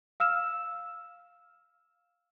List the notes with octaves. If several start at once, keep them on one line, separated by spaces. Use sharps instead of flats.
F5 E6 F6 E7